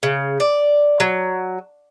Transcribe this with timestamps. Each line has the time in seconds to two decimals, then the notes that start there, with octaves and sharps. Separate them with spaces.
0.03 C#3
0.40 D5
1.00 F#3